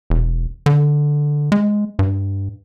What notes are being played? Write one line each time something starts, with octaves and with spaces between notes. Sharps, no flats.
E1
D3
G#3
G2